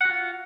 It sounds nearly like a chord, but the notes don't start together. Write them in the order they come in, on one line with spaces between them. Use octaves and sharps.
F#5 F#4 F4